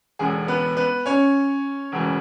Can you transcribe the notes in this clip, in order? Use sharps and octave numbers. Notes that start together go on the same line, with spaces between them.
E1 E2 D3 G#4
B3 B4
B3 B4
C#4 C#5
E1 D2 C#3 E3